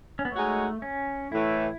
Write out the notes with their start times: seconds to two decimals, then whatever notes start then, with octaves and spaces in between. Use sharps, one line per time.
0.19 C#4
0.25 B3
0.32 G#3 A3 D#4 F#4 C#5
0.82 C#4
1.32 A2 E3 A3 E4